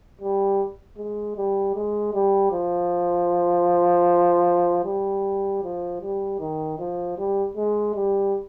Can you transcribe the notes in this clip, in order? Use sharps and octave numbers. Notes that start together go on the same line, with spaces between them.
G3
G#3
G3
G#3
G3
F3
G3
F3
G3
D#3
F3
G3
G#3
G3